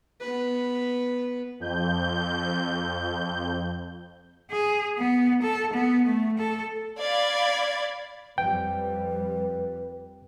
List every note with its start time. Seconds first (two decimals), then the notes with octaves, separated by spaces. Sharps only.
0.21 B3 B4
1.60 F2 G6
4.51 G#4
4.98 B3
5.42 A4
5.73 B3
6.06 A3
6.38 A4
6.99 D5 F5 B5 G#6
8.38 F2 G3 B4 G5